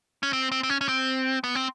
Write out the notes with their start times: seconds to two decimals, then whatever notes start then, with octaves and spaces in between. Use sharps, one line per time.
0.23 C#4
0.33 C4
0.52 C4
0.63 C4
0.70 C#4
0.81 C#4
0.88 C4
1.44 B3
1.55 C4